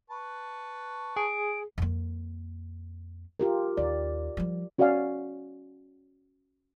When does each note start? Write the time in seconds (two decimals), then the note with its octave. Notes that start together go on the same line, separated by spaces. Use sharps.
0.10 B4 A5 C#6
1.16 G#4 D7
1.78 F2 A#3
3.40 F4 G4 A#4
3.77 D#2 D5
4.37 F3 G3
4.78 C#4 F#4 C#5 D5 F5 G#5